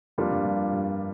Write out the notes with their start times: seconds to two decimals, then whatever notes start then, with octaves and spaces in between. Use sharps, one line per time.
0.18 F2 G3 A#3 D4 F4
0.31 G2
0.45 G2
0.73 G2